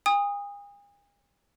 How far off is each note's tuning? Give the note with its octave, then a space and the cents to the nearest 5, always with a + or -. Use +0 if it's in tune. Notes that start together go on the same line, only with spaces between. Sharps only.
G#5 -45 D#6 +0